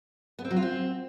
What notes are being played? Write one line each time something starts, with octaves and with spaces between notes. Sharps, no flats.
B3
C4
F#3
F4
C4